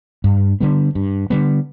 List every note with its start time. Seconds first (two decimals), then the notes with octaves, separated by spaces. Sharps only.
0.24 G2
0.60 D3 G3 B3
0.95 G2
1.30 D3 G3 B3